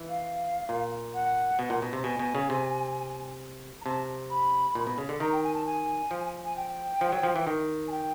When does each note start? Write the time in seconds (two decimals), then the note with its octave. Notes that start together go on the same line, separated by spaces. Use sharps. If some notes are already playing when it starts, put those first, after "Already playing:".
Already playing: E3
0.09 F5
0.69 A#2
1.14 F#5
1.59 B2
1.70 A#2
1.82 B2
1.93 C3
2.04 B2 G#5
2.19 B2
2.35 C#3
2.50 C3
3.81 A#5
3.85 C3 A5
4.30 B5
4.75 A#2
4.87 B2
4.98 C#3
5.09 D3
5.20 D#3 A#5
5.32 G5
5.44 G#5
5.54 A5
5.66 G#5
6.11 F3
6.45 G#5
6.56 G5
7.01 F3
7.12 F#3
7.23 F3
7.36 E3
7.47 D#3
7.88 G#5
7.91 G5